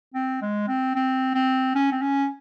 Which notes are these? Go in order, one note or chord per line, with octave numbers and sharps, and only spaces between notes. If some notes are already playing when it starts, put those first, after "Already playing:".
C4
G#3
C4
C4
C4
C#4
C4
C#4